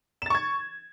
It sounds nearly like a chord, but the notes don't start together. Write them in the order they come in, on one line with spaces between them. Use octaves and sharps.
E7 A6 C#6 G#6